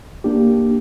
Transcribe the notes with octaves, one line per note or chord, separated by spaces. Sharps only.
A#3 D4 G4